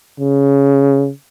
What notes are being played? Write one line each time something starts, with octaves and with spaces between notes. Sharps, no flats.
C#3